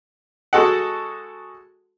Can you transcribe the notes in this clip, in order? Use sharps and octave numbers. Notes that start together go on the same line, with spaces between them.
G#3 F#4 A4 D#5 F#5